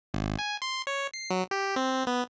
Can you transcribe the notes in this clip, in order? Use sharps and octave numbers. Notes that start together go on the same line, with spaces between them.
G#1
G#5
C6
C#5
C7
F#3
G4
C4
B3